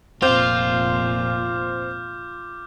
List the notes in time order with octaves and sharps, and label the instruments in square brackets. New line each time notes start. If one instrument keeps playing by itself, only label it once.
[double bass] F1 A#2 [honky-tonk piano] C4 [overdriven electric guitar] F4 [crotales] D6 F6 G6